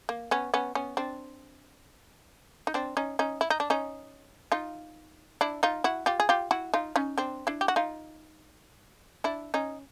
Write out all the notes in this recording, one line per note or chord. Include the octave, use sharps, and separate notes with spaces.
A#3
B3 C#4
B3 C#4
B3 C#4
C4 D4
D#4
C4 D4
C#4 D#4
C#4 D#4
E4
D#4
D4
C#4 D#4
D#4 F4
D4 E4
D#4 F4
E4 F#4
F4 G4
G#4
F4 G4
E4 F#4
D#4 F4
C#4 D#4
C4 D4
D4 E4
G4
F#4
D#4 F4
D4 E4
C#4 D#4